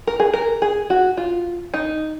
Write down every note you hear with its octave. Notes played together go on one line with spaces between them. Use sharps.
A#4
G#4
A#4
G#4
F#4
F4
D#4